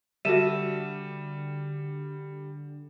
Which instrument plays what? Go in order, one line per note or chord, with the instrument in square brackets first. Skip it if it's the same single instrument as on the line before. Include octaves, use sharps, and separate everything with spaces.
[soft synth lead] D3 [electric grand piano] G3 [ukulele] F#4 A4 E5 [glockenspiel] D#7 E7